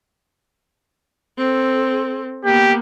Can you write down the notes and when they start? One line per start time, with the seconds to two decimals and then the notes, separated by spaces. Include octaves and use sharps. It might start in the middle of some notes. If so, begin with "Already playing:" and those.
1.38 C4 A4
2.45 A#3 B3 G4